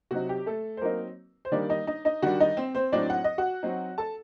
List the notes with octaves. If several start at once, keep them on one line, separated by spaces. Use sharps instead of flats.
C3 F#3 C4 D#4 F#4
G4
A3 A4
C5
F#3 A#3 C4 D#4 A#4
C5
D#3 G3 A#3 D4 D#4 D5
D#4 D#5
D#4 D#5
D#4 D#5
D#3 G3 D4 F#4 F#5
D#4 D#5
C4 C5
C4 C5
A2 F#3 C4 D4 D#4 D5
F#5
D#5
F#4 F#5
F#3 C4 D#4
A4 A5